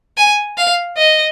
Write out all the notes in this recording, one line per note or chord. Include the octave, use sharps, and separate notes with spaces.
G#5
F5
D#5